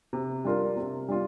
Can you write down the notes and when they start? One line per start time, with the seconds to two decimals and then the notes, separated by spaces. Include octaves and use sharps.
0.13 C3
0.44 G3 D4 F4 A#4
0.76 C3
1.08 G3 D4 F4